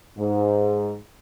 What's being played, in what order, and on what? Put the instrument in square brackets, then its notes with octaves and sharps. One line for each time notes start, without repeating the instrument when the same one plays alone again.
[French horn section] G#2